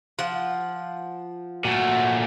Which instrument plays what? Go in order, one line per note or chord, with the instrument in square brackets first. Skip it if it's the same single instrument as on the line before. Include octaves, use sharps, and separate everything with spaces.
[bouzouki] F3 F#5
[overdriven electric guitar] A#2 A3 [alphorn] F#4